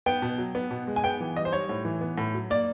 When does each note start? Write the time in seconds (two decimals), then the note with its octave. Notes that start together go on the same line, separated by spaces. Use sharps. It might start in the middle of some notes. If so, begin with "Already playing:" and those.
0.06 B3 G5
0.22 B2
0.38 F#3
0.55 B3
0.71 B2
0.87 G#3
0.96 G#5
1.04 B3 G5
1.21 E3
1.36 G3 D#5
1.45 C5
1.53 G3 C#5
1.69 A2
1.85 E3
2.01 B3
2.18 A2
2.34 F#3
2.50 A#3 D5